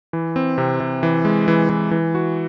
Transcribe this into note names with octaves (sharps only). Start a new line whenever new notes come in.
E3
C4
C3
C3
E3
G#3
E3
E3
E3
F#4